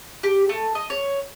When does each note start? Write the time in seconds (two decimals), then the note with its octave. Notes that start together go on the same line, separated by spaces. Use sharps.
0.23 G4
0.49 A3
0.75 D#5
0.90 C#5